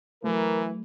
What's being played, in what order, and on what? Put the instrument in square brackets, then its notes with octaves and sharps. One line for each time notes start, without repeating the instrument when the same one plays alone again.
[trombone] E3 [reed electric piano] F#3 A3 [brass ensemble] A#4